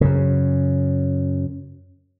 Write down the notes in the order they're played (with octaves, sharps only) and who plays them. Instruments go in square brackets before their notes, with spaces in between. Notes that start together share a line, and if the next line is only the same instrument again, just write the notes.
[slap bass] F#2 C#3